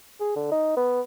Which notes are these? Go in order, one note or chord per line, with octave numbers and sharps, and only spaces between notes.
G#4
D3
D#4
B3